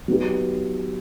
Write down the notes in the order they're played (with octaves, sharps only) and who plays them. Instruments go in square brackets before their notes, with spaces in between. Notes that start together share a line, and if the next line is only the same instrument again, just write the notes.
[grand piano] F#3 B3 D#4 G4